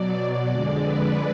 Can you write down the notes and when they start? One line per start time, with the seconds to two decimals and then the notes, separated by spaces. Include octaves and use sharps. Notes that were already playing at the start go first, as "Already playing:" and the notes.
Already playing: B2 F#3 D5
0.51 F2 D3 G#3
0.83 B4